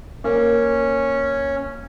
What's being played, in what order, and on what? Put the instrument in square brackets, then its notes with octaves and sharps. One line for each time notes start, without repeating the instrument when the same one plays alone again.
[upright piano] A#3 [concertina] C#4